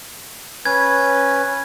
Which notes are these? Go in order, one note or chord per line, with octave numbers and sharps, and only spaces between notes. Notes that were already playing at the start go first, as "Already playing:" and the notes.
C#4 B4 G#6